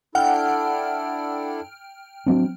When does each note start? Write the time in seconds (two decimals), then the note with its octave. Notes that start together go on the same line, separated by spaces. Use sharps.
0.15 D4 E4 A4 F#5 G5 F6
2.26 F#3 C4 D4